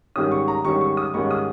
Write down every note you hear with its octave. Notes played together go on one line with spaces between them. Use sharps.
G#2 D#3 G3 C#4 D#6
C#6
A#5
G#2 D#3 G3 C#4 C#6
C#6
D#6
G#2 D#3 G3 C#4 C#6
D#6